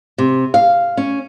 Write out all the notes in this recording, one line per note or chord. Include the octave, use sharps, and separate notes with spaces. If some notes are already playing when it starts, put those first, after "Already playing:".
C3
F5
C#4